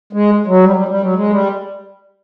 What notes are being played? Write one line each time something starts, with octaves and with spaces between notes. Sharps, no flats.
G#3
F#3
G3
G3
G3
F#3
G#3
G3